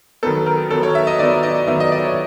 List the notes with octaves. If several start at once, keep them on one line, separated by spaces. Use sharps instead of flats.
D#3 F#3 B3 D#4 A4
A#4
D#3 F#3 B3 D#4 A4
C#5
E5
D#5
D#3 F#3 B3 D#4 D5
D#5
D#3 F#3 B3 D#4 E5
D#5
D5
C#5